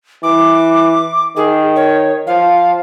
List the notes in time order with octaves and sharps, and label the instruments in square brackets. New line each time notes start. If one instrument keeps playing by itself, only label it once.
[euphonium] E3 [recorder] D6
[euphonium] D#3 [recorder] G#4
[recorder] C#5
[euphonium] F3 [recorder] F5